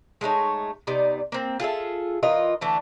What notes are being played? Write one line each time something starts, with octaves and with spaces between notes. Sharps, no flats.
G#3 A3 D#4 C#5
C3 B3 D#4 D5
A#3 C4
F4 G#4 A4 E5
E3 F4 A#4 D#5
D3 E3 A3